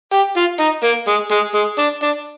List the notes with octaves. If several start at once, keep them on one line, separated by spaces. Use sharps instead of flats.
G4
F4
D#4
A#3
G#3
G#3
G#3
D4
D4